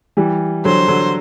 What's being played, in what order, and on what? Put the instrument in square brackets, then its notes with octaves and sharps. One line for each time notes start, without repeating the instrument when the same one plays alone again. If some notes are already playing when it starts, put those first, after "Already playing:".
[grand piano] E3 G3
[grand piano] D3 F#3 [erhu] C5
[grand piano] D3 F#3